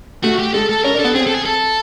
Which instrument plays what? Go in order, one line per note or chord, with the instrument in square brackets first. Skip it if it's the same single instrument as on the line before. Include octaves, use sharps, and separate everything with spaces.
[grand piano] A3 [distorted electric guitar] F#4
[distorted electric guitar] G4
[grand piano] G#3 [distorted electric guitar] A4
[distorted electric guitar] A4
[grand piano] C#4 [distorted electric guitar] A#4
[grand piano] D4
[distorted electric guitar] A4
[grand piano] B3
[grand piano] C4 [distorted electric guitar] G#4
[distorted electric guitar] A4
G#4
A4